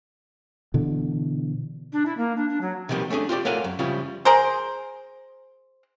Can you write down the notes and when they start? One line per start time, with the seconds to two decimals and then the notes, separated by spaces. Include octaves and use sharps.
0.74 B2 D3 E3
1.93 D4
2.06 E4
2.17 A#3
2.37 D4
2.49 D4
2.61 F#3
2.89 C3 D#3 F3 G3 A#3 B3
3.10 A3 C#4 D4 G#4
3.29 F4 G4 A4 D5
3.45 A3 A#4 C#5 F5 F#5 G#5
3.64 F#2
3.79 C#3 F3 G3 E4 F4
4.25 G#4 A#4 C5